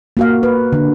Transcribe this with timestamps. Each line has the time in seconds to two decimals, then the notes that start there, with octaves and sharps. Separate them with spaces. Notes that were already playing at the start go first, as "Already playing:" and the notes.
0.17 A#3 F#4 F5
0.43 B4
0.72 D3